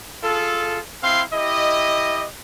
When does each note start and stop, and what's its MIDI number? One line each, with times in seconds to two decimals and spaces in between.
0.23 0.80 65
0.23 0.80 68
0.23 0.80 69
1.03 1.21 60
1.03 1.21 64
1.03 1.21 77
1.03 1.21 84
1.33 2.25 64
1.33 2.25 67
1.33 2.25 75